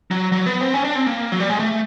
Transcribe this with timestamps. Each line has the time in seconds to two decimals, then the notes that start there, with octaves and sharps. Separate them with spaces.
0.11 F#3
0.32 F#3
0.46 B3
0.61 C4
0.74 C#4
0.84 D4
0.95 C4
1.06 A#3
1.32 F#3
1.40 G3
1.50 G#3
1.60 A3